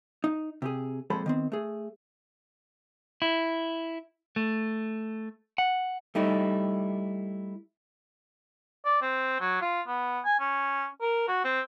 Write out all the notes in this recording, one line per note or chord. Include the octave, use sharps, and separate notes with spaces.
D#4
C3 G4 G#4
F2 A#2 G#3 A4 C5 B5
D#3 B3 C4
A3 G#4
E4
A3
F#5
G3 A3 D#4 E4
D5
C4
F#3
F4
B3
G#5
C#4
A#4
F#4
C4